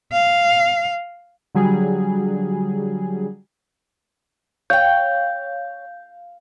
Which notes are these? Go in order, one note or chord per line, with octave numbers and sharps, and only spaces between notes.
F5
D3 F#3 G3 G#4
C#5 F5 G5 G6